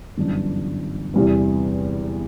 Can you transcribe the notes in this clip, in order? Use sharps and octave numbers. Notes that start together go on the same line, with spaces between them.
G1 F#2 E3 G3 D4
E2 C3 E3 G3 B3